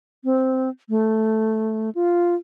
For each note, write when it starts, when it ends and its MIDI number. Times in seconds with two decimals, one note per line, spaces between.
0.24 0.69 60
0.89 1.90 57
1.95 2.35 65